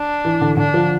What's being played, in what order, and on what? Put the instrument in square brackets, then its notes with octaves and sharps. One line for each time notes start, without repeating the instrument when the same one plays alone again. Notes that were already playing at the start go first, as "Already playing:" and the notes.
Already playing: [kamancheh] D4
[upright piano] E3
D3
[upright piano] D3 [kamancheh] D4
[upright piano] F3